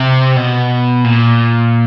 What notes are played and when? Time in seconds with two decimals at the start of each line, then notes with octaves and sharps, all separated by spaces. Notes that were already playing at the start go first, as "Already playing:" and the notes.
Already playing: C3
0.36 B2
1.04 A#2